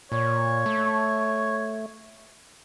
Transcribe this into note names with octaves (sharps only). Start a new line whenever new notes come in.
A#2 C#5
A3